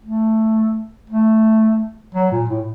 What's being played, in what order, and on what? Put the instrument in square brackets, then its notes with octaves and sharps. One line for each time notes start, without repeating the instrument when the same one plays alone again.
[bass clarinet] A3
A3
F#3
A#2
A2